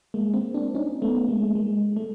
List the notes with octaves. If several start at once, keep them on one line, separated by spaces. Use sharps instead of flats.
G#3 A#3
A#3 C4
C4 D4
C#4 D#4
A3 B3
G#3 A#3
G#3
A3